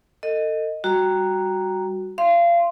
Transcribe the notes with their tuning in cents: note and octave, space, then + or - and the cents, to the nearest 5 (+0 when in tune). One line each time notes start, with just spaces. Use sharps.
A4 +35 D#5 -5
G3 +0 F#4 +0 A#5 +0
F5 -30 C6 +0